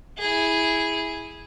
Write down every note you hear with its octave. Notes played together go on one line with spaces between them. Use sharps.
E4 G#4